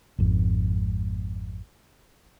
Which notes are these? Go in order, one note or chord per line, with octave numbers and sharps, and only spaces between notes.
G#1 F2 G#2